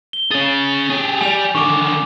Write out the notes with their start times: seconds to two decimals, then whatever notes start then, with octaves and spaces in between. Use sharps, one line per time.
0.13 G7
0.31 C#4 G#4 A6
0.90 G4 G#4
1.21 G3 D5 G#5 F7
1.55 D3 D#3 C#6 D6